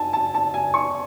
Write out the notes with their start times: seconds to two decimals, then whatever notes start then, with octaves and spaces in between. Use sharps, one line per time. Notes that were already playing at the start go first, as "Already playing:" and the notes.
Already playing: G#5 A5
0.13 A5
0.34 A5
0.54 G#5
0.74 C#6